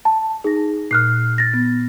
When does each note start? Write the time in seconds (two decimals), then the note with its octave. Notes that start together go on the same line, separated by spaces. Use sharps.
0.05 A5
0.44 D#4 G#4 A#6
0.91 A#2 F6 F#6 C7
1.38 A6 A#6
1.54 B3